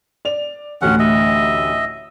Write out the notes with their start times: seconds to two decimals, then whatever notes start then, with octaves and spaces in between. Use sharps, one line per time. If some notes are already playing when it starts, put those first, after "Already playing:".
0.25 D5 F7
0.82 A1 D2 A2 C#4 F#5
0.99 D#5 E5